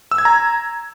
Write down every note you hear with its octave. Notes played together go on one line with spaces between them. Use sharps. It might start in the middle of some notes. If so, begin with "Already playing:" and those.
E6
G#6
A#5